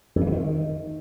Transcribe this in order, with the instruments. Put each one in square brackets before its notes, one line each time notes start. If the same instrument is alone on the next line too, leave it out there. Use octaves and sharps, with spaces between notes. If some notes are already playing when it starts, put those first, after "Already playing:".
[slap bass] F2
E3
D3
D#3